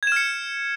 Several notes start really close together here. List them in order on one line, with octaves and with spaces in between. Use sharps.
G#6 E7 F6 C#7